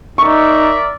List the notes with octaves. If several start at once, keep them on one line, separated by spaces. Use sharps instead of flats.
D#4 A#4 D5 E5 C#6